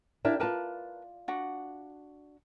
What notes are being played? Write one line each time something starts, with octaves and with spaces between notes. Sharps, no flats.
D4 E4 G4 A#4 F5 A5
F4 A#4 B4 D5 A5
D4 F#4 F#5